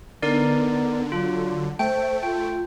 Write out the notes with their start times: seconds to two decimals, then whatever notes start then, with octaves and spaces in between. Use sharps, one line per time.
0.22 D3 B3 D#4 A#4 D5
1.12 F#3 F4
1.79 A3 C5 G5
2.23 F4 G5